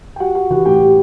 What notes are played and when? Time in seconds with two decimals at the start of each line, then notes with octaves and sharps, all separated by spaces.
0.16 G5
0.20 G3 F#4 F#5
0.35 G3 F#4 F#5
0.50 E3 F#4 F#5
0.65 A2 G4 G5
0.81 G3